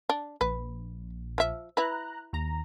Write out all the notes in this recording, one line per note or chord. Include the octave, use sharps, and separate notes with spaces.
D4
A#1 B4
F3 E5
E4 B4 A#5 F#6
D#2 A#5